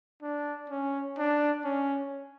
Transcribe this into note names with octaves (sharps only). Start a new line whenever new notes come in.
D4
C#4
D4
C#4